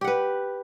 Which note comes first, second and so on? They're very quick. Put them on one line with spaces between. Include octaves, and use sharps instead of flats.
G4 F#5 B4